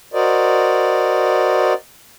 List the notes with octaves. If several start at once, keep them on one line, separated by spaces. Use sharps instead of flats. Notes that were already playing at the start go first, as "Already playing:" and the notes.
F#4 A#4 C5 D5 D#5